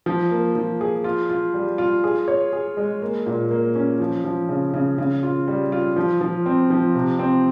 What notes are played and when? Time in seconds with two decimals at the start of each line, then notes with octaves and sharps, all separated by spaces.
0.06 F3
0.31 A#3
0.56 F3
0.81 G#4
1.04 F4
1.29 F4
1.54 G3
1.78 F4
2.04 G#4
2.28 C#5
2.53 G#4
2.77 G#3
3.02 A#3
3.27 A#2
3.51 A#3
3.75 C#4
4.00 F3
4.25 F3
4.49 C#3
4.73 C#3
4.98 C#3
5.23 F4
5.48 G3
5.72 F4
5.96 F3
6.21 F3
6.46 C4
6.70 F3
6.95 C3
7.19 C4